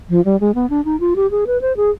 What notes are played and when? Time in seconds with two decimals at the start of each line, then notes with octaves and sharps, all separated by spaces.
0.09 F3
0.25 G3
0.40 G#3
0.55 B3
0.70 D4
0.85 D#4
1.00 F4
1.16 G4
1.31 G#4
1.47 B4
1.61 C5
1.77 G#4